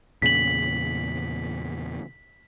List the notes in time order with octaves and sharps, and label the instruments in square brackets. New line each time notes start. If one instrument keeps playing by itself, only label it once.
[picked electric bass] E2 A#2 C#3 [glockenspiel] B6 F#7